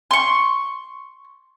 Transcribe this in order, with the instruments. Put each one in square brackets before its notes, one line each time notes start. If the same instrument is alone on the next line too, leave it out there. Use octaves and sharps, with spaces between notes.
[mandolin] C6 C#6